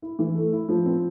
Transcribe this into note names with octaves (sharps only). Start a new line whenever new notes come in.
E4
E3
A3
E4
F3
C4